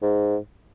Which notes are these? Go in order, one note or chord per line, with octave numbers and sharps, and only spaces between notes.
G#2